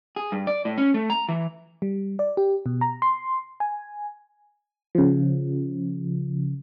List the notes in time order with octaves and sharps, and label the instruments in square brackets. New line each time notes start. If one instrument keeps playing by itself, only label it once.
[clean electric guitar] G#4
G2
D5
A2
C#4
A3
A#5
E3
[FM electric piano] G3
D5
G4
B2
A#5
C6
G#5
C#3 F3